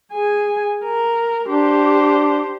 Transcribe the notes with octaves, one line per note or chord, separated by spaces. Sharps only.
G#4 G#5
A#4
D4 G4 C5